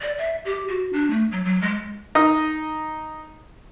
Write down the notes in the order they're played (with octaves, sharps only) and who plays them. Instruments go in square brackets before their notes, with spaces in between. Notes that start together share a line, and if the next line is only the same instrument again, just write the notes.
[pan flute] D5
E5
G4
F#4
D4
A3
F#3
F#3
G#3
[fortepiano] D#4 D#6